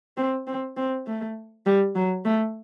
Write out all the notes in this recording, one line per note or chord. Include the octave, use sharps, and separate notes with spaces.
C4
C4
C4
A3
G3
F#3
A3